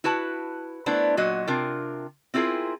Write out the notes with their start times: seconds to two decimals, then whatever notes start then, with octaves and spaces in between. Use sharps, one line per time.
0.04 E4 F#4 B4 A5
0.86 A3 B3 D4 E4 B4 C5
1.17 A#2 F#3 F#4 D#5
1.47 C3 D4 F4 A#4
2.34 C4 E4 F4 G#4 A#4